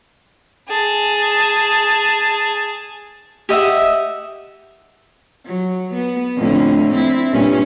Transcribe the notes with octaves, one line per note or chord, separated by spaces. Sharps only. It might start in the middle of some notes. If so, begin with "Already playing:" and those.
G#4 A5
G4 D#5 E5 F#5
F#3
B3
F2 A2 D3
C4 E4
G2 A#2 C#4